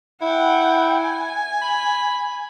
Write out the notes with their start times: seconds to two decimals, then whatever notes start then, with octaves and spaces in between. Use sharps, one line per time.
0.22 E4 F#5 G5
0.99 G#5
1.62 B5